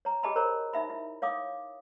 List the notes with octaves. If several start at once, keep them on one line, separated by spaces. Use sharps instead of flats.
C#5 A#5
G4 G#4 D#5 G#5 A5 B5
A#4 C5 C#5 A#5
D#4 E5 B5
E4
C#5 F5 D6 D#6